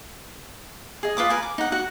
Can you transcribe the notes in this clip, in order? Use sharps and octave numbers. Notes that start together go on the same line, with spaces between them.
G#4 D#5
F4 B4 D6 D#6
A#4 B4 G#5
D6
D#4 F#5
F#4 F#5